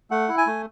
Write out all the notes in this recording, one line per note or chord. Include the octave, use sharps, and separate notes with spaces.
A3 F#5
E4
G#5
A3